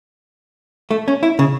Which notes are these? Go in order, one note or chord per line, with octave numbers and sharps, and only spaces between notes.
A3
C#4
E4
C#3